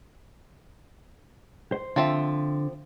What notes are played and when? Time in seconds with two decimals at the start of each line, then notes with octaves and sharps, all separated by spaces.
1.72 C5
1.96 D3 F3 C4 E5